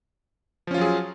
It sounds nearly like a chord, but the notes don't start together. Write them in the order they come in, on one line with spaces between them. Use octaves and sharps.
F3 C#4 F4 F#3 G#4